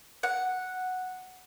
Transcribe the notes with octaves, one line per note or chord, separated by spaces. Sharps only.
F#5